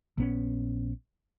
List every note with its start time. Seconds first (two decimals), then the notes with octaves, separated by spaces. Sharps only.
0.18 A#1 B3 C#4